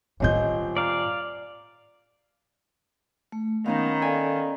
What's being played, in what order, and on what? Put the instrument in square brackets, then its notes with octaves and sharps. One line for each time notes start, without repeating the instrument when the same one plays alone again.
[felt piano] D#1 C4 G6 [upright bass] A2 F4 [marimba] C#5 D#5
[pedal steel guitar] D5 F5 [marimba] A#5
[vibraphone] A3
[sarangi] D#3 [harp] B3 C#4 D#4 [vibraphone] F5
[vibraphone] A4 D5 F5 [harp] G#5